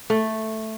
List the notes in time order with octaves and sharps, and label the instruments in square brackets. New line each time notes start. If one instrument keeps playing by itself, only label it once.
[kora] A3